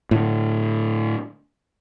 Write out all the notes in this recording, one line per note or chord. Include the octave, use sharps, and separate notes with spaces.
A2 D3